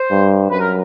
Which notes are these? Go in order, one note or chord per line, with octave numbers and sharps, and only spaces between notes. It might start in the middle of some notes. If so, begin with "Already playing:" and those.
Already playing: C5
G2
F#2 B4
A#4